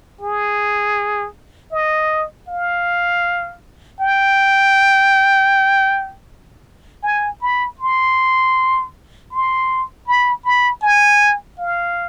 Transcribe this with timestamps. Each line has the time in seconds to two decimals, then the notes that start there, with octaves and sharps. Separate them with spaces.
0.21 G#4
1.72 D#5
2.49 F5
4.01 G5
7.03 G#5
7.41 B5
7.79 C6
9.31 C6
10.07 B5
10.45 B5
10.82 G#5
11.58 F5